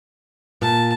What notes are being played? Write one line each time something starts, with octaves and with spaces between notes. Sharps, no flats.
A#2 A5